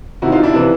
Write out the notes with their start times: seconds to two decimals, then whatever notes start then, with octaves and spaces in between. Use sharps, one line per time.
0.22 C3 D#3 E4 F#4
0.32 D#4 F4
0.43 D4 E4
0.53 C3 E3